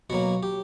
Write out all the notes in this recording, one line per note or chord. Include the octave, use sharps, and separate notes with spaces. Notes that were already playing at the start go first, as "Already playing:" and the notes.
B2 F#3 A#3 F#4
G4